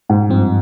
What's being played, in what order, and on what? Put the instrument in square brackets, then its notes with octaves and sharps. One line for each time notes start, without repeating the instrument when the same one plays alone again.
[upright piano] G#2
[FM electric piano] G2 F3 C4